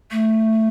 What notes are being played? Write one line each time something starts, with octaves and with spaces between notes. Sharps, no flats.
A3